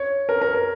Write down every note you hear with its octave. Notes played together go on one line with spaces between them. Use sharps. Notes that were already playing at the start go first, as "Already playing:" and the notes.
Already playing: C#5
A#4
A#4
A#4